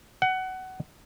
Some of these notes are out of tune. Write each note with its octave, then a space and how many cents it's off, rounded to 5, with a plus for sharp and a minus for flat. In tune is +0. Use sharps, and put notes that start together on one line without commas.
F#5 +20